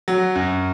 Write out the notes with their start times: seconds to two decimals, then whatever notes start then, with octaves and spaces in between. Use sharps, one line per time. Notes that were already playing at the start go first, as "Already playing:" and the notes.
0.08 F#3
0.36 F#2